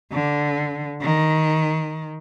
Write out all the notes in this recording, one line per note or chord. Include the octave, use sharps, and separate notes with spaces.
D3
D#3